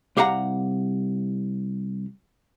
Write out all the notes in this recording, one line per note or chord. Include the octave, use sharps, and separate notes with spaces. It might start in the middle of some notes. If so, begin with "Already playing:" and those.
C2 G4 F5 F#5 A#5